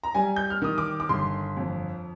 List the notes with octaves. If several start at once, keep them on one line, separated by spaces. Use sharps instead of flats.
A#5
G3 G#5
G6
F6
D#3 D#6
D6
D6
G1 C6
F2